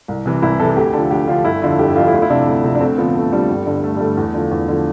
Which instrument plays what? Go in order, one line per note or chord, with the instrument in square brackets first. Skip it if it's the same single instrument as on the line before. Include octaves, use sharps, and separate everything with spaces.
[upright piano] C2
C3 E3
C2 E4
C3 E3 A4
A4
D2 G4
D3 F3 A4
D2 G4
D3 F3 F4
G1 E4
F2 D3 F4
G1 G4
F2 D3 F4
E4
D2 F4
E4
C3 F3 D4
D2
C3 F3
D4
D2 C4
D3 F3 B3
D2 A3
D3 F3 G3
G1
G2 D3
G1 A3
G3
G2 D3 A3
E2
D3 F3
E2
D3 F3